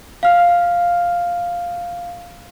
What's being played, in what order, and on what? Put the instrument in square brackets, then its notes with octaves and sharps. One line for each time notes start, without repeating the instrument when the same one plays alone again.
[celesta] F5 F6